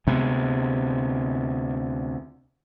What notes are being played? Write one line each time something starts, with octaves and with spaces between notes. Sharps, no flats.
D2 C3 G#3 B3